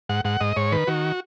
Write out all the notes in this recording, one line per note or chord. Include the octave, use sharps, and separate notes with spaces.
G#2 F#5
G#2 F#5
G#2 D#5
G#2 C#5
D#3 B4
D#3 F#4